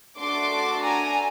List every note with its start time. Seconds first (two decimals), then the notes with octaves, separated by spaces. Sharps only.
0.19 A3 D4 F#4 A4 C6 D6
0.82 G#5 A#5